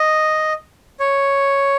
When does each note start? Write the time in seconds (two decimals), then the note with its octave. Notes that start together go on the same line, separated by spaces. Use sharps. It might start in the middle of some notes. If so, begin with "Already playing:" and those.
Already playing: D#5
1.00 C#5